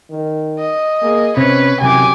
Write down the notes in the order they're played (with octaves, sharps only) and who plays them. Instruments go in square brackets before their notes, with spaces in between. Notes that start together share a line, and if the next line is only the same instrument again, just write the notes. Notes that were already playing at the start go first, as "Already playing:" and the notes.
[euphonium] D#3
[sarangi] D#5
[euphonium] A#3 [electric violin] G#4
[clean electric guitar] C3 C#4 [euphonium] C4 [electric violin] B4 [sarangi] C#5
[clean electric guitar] C2 C3 E3 [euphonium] F#2 [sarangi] G4 [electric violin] G#5 D6